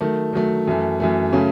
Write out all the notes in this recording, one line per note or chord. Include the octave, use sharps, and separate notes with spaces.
D#3 F#3 A3
D#3 F#3 A3
F#2 E3 A3
F#2 E3 A3
C#3 F#3 A3 C#4